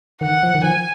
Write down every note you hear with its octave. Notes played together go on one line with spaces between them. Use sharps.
D#3 F#5
F3
D#3
F3 G#5